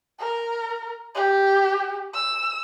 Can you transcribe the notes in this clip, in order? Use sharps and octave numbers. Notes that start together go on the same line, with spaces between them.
A#4
G4
E6